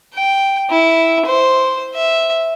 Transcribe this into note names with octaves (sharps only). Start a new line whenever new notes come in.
G5
E4
C5
E5